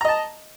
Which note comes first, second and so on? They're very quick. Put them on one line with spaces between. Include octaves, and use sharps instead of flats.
A#5 D#5 A5